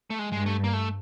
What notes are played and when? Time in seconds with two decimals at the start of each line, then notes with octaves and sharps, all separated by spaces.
0.10 A3
0.19 G#3
0.32 G2 G#3
0.46 A3
0.64 A#3
0.73 A3